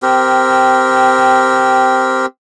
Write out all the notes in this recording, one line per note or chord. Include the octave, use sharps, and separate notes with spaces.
C4 G4 A#4